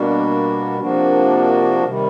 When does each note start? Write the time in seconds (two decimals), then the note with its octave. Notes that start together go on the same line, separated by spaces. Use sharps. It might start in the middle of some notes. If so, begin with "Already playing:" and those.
Already playing: B2 G3 A#3 D4 F#4
0.80 C3 F3 A#3 D4 F#4
1.85 C3 D#3 G3